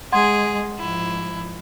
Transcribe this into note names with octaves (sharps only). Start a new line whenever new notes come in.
G#3 G#4 F#5 C6 G#6
G#2 F3 E4